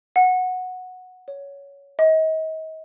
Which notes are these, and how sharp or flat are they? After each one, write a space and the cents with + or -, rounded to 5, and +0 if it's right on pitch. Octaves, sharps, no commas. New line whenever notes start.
F#5 -10
C#5 +15
D#5 +35